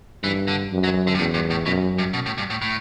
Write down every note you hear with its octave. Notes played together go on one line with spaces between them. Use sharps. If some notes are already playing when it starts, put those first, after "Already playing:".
G2 E3
D3
F#2
F#3
D3
G2
E2 A2
G2
A2
F#2 B2
G2
B2
A2
G2
A2
A2